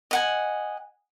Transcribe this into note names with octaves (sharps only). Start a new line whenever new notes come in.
D#5 F#5 G#5